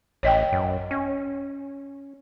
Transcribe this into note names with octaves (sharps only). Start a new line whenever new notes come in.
A1 C#5 D#5 G5
F#2
C#4